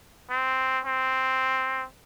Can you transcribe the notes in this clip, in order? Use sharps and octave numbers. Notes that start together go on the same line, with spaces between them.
C4
C4